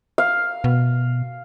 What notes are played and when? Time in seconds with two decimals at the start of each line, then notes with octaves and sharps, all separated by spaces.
0.18 F5
0.64 B2